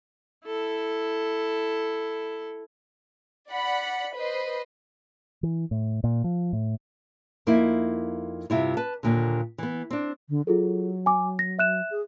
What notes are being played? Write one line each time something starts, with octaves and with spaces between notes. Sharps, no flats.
E4 A4
D5 F#5 B5
B4 C5 D#5
E3
A2
A#2
F3
A2
F2 A#3 D#4 E4
G2 C3 E4 F4
B4 A5
D#2 A#2 D3
E3 B3
C4 D4
D3
F#3 F4 G#4 A4
G#5 D6
A#6
E5 F#6 E7
G#4